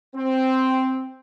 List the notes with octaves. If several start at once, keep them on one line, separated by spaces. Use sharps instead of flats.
C4